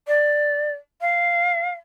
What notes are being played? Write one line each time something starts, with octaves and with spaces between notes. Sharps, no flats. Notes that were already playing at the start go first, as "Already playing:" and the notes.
D5
F5